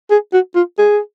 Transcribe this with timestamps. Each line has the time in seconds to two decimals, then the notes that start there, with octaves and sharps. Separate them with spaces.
0.11 G#4
0.33 F#4
0.55 F4
0.78 G#4